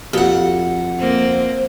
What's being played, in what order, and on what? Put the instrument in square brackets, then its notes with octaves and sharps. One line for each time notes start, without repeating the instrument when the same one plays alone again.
[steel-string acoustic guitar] F2 F#5 [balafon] F#4 G4
[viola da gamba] A#3 C4 [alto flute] C5